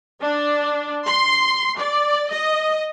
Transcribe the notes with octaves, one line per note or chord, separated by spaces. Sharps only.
D4
C6
D5
D#5